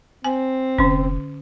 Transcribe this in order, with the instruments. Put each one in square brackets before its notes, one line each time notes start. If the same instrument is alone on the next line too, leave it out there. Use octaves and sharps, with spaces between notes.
[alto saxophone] C4 [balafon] G#5
[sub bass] F1 [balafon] D3 C#4